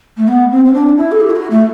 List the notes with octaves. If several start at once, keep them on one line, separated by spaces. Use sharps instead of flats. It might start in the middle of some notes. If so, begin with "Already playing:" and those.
A3
B3
C4
C4
D4
E4
A4
G4
E4
F#4
A3